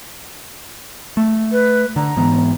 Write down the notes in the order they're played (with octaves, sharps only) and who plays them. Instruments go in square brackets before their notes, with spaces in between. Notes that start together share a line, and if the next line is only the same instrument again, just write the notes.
[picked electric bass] A3
[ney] B4
[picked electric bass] D3 [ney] A#5
[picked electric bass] G#2 E3 B3